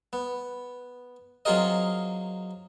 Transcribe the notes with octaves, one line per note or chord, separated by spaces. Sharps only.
B3
F#3 C4 F4 G#4 A#4 D#5